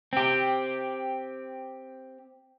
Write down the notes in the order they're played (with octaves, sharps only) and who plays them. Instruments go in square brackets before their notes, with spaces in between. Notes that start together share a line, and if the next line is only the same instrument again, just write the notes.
[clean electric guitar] C4 G4